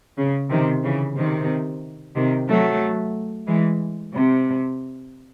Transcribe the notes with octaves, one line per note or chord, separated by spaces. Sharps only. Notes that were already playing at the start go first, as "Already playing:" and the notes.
C#3
C3 D#3
C#3 E3
C3 D#3
C3 D#3
F#3 A3
E3 G#3
C3